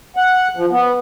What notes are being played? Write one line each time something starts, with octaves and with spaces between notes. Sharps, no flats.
F#5
F3
B3